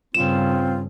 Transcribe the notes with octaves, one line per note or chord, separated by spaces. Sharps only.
G2 C#3 C4 F4 E7